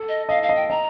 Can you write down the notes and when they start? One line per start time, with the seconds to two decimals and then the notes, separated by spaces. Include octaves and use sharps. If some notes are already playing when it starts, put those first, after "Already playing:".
Already playing: A4
0.09 D#5
0.29 D#5 F5
0.43 F5
0.49 D#5
0.56 G5
0.70 D#5 A#5